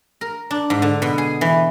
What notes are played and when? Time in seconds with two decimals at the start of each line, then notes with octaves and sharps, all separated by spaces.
0.21 A#4
0.51 D4
0.70 G#2
0.82 D3
1.02 B2
1.18 G#4
1.41 E3